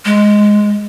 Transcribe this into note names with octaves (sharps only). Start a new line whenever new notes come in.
G#3